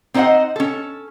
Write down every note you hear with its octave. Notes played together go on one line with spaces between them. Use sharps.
C4 D#4 C5 D5 D#5 F#5
C#4 A4